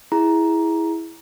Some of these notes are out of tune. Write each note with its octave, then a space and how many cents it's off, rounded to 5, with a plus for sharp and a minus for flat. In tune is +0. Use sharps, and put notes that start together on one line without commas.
E4 +0 G#4 +0 A#5 +10